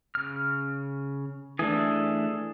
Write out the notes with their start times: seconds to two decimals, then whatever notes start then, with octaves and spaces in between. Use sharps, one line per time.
0.15 C#3 F6
1.59 E3 A3 D4 G#4 A4